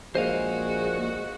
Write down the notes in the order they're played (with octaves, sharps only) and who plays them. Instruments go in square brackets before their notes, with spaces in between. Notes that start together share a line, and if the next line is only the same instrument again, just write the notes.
[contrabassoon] A#1 [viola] G#3 F#4 [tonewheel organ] A#3 G#4 [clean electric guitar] C5 D#5 F5